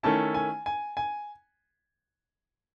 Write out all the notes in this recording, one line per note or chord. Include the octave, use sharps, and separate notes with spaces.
D#3 A3 C#4 E4 A5
G#5
G#5
G#5